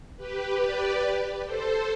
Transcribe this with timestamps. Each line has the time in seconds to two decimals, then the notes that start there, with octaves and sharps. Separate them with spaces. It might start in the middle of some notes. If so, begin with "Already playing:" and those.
0.17 G4 B4
0.60 B4 D5
1.45 A4 C5